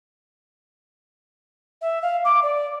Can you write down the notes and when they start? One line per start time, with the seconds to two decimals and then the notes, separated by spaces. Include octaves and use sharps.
1.81 E5
2.02 F5
2.25 D6
2.43 D5